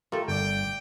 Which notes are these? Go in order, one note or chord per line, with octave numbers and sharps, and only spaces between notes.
A3 F4 G4 A4 A#4
G1 D5 G5